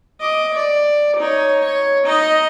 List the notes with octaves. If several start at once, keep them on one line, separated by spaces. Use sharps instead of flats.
D#5 D6
D5
D#4 C#5
C#5
D#4 D#5